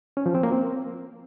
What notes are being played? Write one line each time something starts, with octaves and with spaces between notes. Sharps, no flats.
C#4
F3
C4
A#3
C4